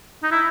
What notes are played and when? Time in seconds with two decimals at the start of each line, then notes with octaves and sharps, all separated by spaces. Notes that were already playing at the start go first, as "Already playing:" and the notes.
0.23 D#4
0.31 E4